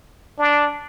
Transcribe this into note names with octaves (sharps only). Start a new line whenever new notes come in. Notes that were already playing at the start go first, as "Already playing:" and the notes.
D4